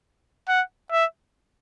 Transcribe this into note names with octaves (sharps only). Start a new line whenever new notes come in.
F#5
E5